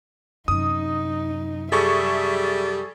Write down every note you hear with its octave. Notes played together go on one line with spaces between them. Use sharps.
F#2 C3 D#4 D#6
G3 G#4 A4 E5 C#6